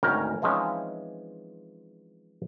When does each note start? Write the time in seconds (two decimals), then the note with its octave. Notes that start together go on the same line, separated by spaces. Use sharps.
0.03 G#1 D2 C#4 A#4 G5
0.42 E3 F3 G#3 C4 C#4 D#4